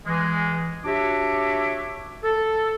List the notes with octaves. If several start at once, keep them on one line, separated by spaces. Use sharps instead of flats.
E3 G#3
D4 F#4 G4 C#5 E5 D6
A4